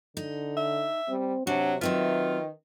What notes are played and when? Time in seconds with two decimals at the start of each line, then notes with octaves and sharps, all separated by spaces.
0.17 D3 D#4
0.57 E5
1.09 G3 C4
1.47 C3 F#3 D4 F#4
1.81 D#3 F#3 C4 F4 B4 E5